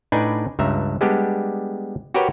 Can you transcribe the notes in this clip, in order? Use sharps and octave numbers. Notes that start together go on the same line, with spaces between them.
A2 D4 D#4 B4 D5 G#5
C#2 G2 E5 A#5
G3 G#3 B3 D4 G4
F#4 G4 A#4 B4 C#5 G5